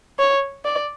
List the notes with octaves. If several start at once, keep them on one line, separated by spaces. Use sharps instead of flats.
C#5
D5